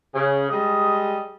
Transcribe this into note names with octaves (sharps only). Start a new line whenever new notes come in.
C#3
G3 G#3 D#5